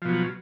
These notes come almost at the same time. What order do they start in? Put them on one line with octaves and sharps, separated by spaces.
F3 B2 F#3